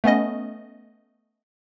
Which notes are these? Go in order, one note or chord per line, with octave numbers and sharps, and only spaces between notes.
A3 B3 C#4 D#5